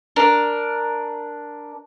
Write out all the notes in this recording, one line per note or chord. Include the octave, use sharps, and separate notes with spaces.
D4 A#4